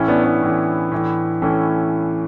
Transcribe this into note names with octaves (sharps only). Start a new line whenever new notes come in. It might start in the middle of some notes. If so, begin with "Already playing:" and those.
Already playing: A2 E3 C#4 E4
B3 D4
B3 D4
A2 E3
A2 E3
A2 E3 A3 C#4